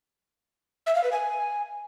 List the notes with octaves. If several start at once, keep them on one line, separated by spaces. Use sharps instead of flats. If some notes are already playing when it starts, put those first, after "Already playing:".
E5
F5
B4
G#5